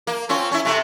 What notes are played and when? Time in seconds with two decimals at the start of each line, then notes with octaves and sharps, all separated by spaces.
0.07 A#3
0.29 C4 C#4 F4
0.51 C#4 E4
0.65 C3 A3